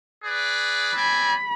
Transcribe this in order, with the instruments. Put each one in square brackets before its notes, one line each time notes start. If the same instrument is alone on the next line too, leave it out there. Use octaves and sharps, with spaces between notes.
[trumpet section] G#4 B4 D5
[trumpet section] C4 D5 G#5 [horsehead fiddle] B5